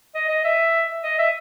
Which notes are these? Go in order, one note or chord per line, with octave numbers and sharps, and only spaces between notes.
D#5
D#5
E5
D#5
E5